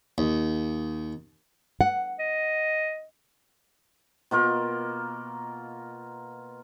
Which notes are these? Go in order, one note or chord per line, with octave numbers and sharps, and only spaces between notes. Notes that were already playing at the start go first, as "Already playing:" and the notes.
D#2
F#5
D#5
B2 A#3 F4 A#4